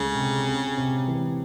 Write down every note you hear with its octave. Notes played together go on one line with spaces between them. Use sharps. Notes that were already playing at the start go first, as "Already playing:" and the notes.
Already playing: C#2 C#3 A3
C3
C4
C3
E3